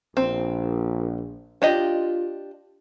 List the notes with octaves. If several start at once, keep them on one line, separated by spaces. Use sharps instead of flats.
A#1 C4
D4 F4 G4 D#5